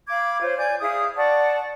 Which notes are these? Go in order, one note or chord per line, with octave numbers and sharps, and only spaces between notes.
F5 B5 D6 G#6
F4 C5 C#5
D5 G#5 G6
E4 G#4 F5 D#6
D5 F#5 A5 C#6